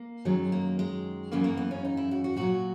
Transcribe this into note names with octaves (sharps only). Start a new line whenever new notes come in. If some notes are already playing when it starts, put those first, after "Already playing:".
Already playing: A#3
F#2 D#3 F#3 G#3
A#3
G#3
F#2 C#3 E3 A#3
A#3
B3
C#4
D#4
E4
F#4
F#4
A#2 F#3 F#4